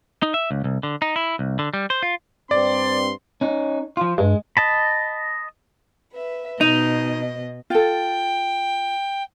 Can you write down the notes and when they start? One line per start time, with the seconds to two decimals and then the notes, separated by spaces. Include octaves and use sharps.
0.23 D#4
0.34 E5
0.51 C#2
0.64 C2
0.83 D3
1.02 D#4
1.16 E4
1.39 C2
1.59 D3
1.74 G3
1.90 C5
2.03 F4
2.51 G2 C4 D5 C6
3.41 C#4 D#4
3.97 F3 F4
4.18 G2 G#3
4.57 D#5 A5 B5
6.13 B4 E5
6.61 B2 D#4 D#5
7.70 F4 A4 G5